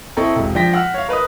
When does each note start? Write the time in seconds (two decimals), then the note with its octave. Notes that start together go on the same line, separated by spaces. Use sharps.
0.17 C4 E4 A4 D#5 A#5 C#6
0.36 E1 C3
0.55 F3 D4 G5 A#6 B6
0.73 F#5 E6 F6
0.94 C#5 F5
1.09 A#4 B4 D#5 D#6